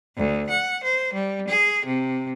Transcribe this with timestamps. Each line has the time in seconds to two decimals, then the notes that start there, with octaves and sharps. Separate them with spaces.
0.17 D2
0.50 F#5
0.84 C5
1.13 G3
1.48 G#4
1.86 C3